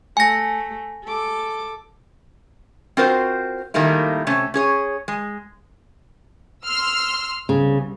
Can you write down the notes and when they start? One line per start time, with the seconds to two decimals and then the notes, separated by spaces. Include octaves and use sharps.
0.17 A3 G#5 A#6
1.04 A4 D6
2.97 C4 F4 F#4 A#4 C5
3.74 A#2 D#3 G3 A3 A#3 E4
4.27 C3 A3 C#4
4.54 C#4 G#4 C#5
5.08 G#3
6.64 C6 E6 F6
7.49 C2 C#3